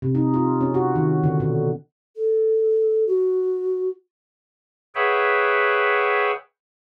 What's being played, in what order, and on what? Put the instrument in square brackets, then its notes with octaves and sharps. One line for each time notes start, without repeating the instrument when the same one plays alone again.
[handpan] C3
D#4
F4
C#4
F#4
D#3
D3
B2
[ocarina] A4
F#4
[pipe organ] G#4 B4 C#5 E5 F#5 G5